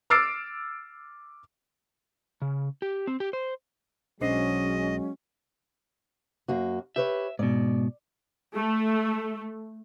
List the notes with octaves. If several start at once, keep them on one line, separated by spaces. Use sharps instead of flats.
D6 E6 F6 A6 C7 D7
C#3
G4
C4
G4
C5
B1 F#3 G#3 C#4 D4 C5 D#5
F#2 A#3 F#4
G4 B4 C#5 E5
G#2 B2 D5
A3